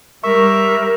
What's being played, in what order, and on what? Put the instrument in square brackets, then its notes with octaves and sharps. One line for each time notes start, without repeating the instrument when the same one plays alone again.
[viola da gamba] G3 [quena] A#4 [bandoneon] E5 [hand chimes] C#6